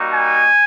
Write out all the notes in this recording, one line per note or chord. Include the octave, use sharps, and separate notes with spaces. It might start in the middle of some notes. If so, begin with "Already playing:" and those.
Already playing: G3 A#3 D#4 F#4
G#5